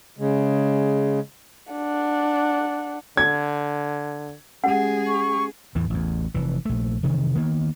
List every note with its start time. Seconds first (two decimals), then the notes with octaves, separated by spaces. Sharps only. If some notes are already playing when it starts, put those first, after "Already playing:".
0.18 C#3 G#3
1.73 D4 F#5
3.17 D3 G#6
4.64 G#3 C#4 G4 G#4 F#5
5.07 C#6
5.75 E2 A2 E3
5.90 A1 E2
6.34 F1 E3
6.65 A#1 A3
7.03 F1 C3 D#3 E3
7.35 D#3 A#3 B3